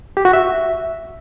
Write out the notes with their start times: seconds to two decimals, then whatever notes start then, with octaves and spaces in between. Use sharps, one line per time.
0.17 G4
0.25 F#4
0.33 E5